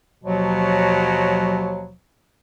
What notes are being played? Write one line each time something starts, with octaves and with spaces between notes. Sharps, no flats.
D#2 B2 F3 F#3